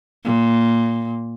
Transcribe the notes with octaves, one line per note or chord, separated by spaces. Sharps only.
A#2